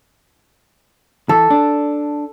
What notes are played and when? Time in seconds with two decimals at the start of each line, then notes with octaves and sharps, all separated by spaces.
1.29 E3 A4
1.50 D4